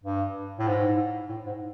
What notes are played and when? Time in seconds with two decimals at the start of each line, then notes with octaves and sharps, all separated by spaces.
0.04 G2
0.59 A2
0.68 G#2
1.29 A2
1.46 G#2